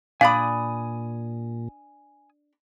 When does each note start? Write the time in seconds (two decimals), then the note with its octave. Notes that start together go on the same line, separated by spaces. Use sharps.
0.21 A#2 D4 D5 F5 G#5 B5 D#6